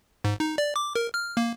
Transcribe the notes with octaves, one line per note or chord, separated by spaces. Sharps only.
G#2
D#4
D5
D6
A#4
F6
A#3